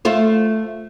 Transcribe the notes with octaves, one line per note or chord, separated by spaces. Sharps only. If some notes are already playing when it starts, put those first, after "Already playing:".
A3 F4 C5